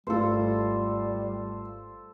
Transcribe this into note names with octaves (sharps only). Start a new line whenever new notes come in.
G#1 G#2 G3 A3 F4 A4 B4 C5